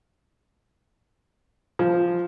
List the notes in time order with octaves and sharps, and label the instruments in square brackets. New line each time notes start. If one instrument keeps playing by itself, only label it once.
[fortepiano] F3